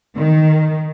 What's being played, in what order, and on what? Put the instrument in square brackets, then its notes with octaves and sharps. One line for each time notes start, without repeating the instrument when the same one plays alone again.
[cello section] D#3